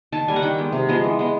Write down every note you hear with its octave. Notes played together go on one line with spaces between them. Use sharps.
D#3 A5
G3 A#3 G#5
F#5
D#3 G5
G#3 B3
C3
F3 G#3 B3
E3
G#3 B3